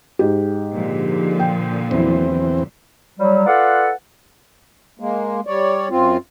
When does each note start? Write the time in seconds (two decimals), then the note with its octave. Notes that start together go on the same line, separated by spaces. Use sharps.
0.19 G#2 G4
0.73 A#2 D3 F3
1.40 G5
1.91 E2 F#3 C4 E4
3.19 F#3 G3
3.46 F4 A4 B4 D5 F5 F#5
4.99 G#3 A#3
5.47 G3 C#5 D5
5.90 F#2 C4 F4